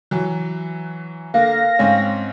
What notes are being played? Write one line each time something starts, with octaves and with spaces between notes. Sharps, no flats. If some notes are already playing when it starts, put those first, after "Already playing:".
E3 F#3
D3 A#3 F5 A#6
G#2 C4 C#4